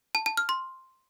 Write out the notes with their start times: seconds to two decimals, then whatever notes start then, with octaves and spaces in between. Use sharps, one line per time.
0.15 A5
0.26 A5
0.37 F6
0.49 C6